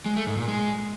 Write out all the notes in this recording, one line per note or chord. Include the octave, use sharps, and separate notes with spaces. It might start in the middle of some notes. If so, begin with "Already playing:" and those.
G#3
A3
G#2
A#2
G#3